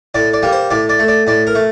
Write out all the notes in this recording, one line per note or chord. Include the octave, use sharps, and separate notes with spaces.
A2 D5
D5
G3 A#3
C5
A2 D5
D5
A3
D5
A2 D5
A#4
A3